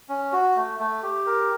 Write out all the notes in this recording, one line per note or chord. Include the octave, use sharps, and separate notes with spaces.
C#4
F#4
A3
A3
G4
A#4